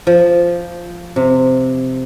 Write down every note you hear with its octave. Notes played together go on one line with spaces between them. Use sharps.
F3
C3